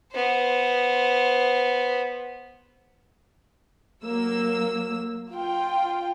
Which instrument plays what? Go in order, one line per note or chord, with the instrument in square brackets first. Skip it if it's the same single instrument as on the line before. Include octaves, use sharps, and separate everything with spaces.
[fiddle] B3 C5
[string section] F#3 A#3 E6
F4 G5